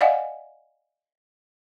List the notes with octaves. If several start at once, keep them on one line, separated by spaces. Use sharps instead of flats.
D5 D#5 F5 F#5 G#5